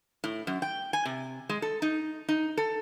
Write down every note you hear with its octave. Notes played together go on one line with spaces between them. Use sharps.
A2
F#2
G5
G#5
C3
G#3
A4
D#4
D#4
A4